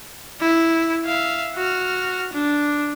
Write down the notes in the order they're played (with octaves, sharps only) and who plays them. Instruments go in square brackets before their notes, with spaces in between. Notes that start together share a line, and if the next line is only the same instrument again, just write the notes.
[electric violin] E4
E5 F5
F#4 F6
D4